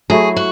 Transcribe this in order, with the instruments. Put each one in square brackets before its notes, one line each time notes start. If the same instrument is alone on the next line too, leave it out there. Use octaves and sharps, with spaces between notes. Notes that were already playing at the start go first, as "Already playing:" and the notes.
[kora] F#3 A3 E4 [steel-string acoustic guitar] G#4
[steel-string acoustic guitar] F#4